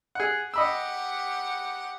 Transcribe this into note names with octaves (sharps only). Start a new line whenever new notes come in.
G#4 F#5
G4 D#5 F#5 B5 E6